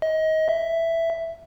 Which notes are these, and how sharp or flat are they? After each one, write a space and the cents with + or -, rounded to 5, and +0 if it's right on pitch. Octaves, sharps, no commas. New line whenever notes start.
D#5 +25
E5 +5